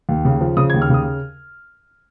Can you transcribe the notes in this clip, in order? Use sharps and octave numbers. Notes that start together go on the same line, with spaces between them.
D#2
C#3
F3
C#3 D#6
G#6
D#2
F6
C#3 D#6